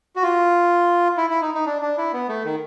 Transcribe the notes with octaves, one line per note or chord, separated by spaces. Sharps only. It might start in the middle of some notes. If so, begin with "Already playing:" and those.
F#4
F4
E4
E4
D#4
D#4
D4
D4
E4
B3
A3
D#3